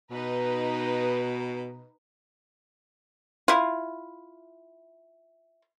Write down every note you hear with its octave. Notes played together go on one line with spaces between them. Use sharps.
B2 D#4 B4
E4 F4